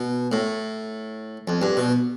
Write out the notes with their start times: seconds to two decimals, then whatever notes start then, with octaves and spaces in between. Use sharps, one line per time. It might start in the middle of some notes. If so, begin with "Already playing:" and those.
Already playing: B2
0.32 A2
1.48 F2
1.62 G2
1.77 B2